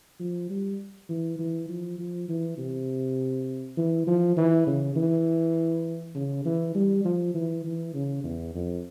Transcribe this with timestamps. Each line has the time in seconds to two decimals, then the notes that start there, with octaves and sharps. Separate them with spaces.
0.20 F3
0.50 G3
1.09 E3
1.39 E3
1.69 F3
1.98 F3
2.29 E3
2.58 C3
3.77 E3
4.07 F3
4.37 E3
4.67 C#3
4.96 E3
6.15 C#3
6.45 E3
6.75 G3
7.05 F3
7.34 E3
7.64 E3
7.94 C#3
8.24 E2
8.54 F2